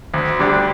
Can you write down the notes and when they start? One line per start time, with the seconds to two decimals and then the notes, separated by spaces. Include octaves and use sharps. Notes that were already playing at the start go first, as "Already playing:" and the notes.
0.14 D2
0.39 D3 G3 D4 G4